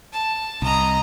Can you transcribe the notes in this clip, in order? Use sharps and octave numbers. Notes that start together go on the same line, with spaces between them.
A5
C2 D#5 A#5